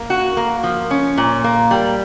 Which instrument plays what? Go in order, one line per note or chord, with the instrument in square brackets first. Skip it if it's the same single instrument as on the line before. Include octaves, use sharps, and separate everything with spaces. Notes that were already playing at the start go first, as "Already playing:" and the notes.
Already playing: [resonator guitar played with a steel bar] A#3
F#4
A#3
F3
C#4
A#2
A#3
G3